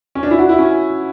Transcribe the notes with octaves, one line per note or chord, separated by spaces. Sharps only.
C#4
D4
E4
F#4
E4
C#4